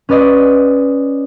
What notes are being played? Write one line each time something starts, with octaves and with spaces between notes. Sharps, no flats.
C#4 B4 D5 D#5